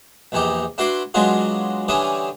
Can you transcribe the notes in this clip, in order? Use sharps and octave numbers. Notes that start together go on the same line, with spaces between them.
A#1 E2 E3 D#4 G4
D4 E4 F#4 B4 C6 D6
F#3 G#3 B3 D4 F4 F#4
D3 E3 G3 C#4 D4 D#6